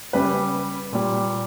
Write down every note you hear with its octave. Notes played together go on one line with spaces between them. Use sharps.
C#3 G3 B4
A#2 G3